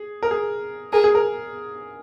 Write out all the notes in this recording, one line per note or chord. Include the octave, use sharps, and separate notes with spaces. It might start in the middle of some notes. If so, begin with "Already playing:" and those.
Already playing: G#4
A#4
G#4
G#4 A#4
G#4
A#4